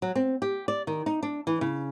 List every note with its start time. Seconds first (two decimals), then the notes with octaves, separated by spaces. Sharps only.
0.02 F#3
0.15 C4
0.42 G4
0.68 D5
0.87 D#3
1.06 D#4
1.23 D4
1.47 E3
1.61 C#3